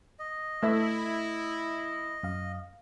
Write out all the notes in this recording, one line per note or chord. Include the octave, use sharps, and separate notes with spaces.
D#5
A3 E4 E5
F#2 F5